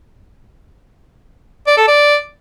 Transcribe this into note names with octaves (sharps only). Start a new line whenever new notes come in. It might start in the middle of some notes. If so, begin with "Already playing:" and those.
D5
A4
D5